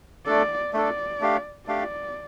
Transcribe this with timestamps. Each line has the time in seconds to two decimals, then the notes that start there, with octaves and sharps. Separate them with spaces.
0.26 A3 D4 A4 D5
0.73 A3 D4 A4 D5
1.21 A3 D4 G4 F5
1.68 A3 D4 G4 D5 F5